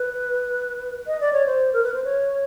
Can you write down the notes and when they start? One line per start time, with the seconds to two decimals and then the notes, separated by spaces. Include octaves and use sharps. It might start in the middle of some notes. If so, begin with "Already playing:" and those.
Already playing: B4
1.07 D#5
1.20 D5
1.33 C#5
1.46 C5
1.73 A#4
1.83 B4
1.94 C5
2.04 C#5